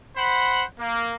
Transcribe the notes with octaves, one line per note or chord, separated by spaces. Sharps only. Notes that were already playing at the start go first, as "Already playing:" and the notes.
C5 F#5 B5
A#3